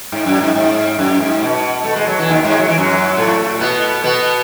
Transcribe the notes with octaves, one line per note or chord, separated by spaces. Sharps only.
G#2
F#2
G#2
G#2
F#2
G#2
B2
A3
G#3
F#3
E3
D#2 D#3
G#2 G#3
F#3
E3
F#2 F#3
A2 A3
B2 B3
B2 B3